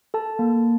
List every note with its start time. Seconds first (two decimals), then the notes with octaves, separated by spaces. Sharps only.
0.14 A4 A5
0.39 A#3